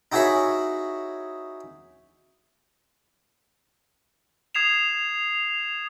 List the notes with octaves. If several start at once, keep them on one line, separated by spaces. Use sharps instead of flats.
D#4 E4 F#4 G#4 C#5 E5
D#6 G#6 C7 E7 F7